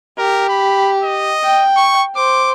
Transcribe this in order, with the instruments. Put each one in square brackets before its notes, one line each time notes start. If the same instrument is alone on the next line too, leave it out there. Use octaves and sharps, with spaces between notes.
[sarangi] G4 [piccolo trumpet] A#4
[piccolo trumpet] B5
D#5
[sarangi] G5
[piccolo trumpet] C#6
[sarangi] C5 [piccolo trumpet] D6